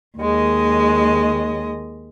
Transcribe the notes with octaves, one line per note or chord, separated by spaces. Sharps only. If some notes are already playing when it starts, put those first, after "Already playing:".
D#2 G#3 D#5